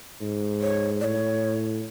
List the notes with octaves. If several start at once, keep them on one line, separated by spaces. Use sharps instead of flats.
G#2
C#5
A2 C#5 D5